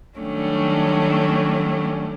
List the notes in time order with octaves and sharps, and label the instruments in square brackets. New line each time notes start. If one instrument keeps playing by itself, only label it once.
[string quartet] D#3 F#3 G3 A3 C#4 D4